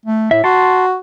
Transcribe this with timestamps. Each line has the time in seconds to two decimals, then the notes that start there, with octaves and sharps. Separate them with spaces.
0.06 A3
0.31 A2 E5
0.44 F#4 A5 C6